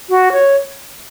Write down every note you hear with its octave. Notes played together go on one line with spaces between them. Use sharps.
F#4
C#5